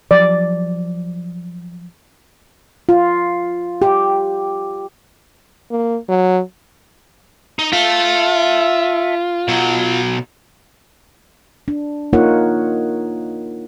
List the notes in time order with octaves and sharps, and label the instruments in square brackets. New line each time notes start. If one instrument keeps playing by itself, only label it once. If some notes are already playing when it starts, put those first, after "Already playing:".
[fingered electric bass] F3 F#3 [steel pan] D5
[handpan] F4
G4
[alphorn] A#3
F#3
[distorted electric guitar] D#4
[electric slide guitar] F4 [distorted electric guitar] E5 A5
[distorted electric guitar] B2 F#3
[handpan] D4
A#3 D#4 F4 A#4 C#5 F#5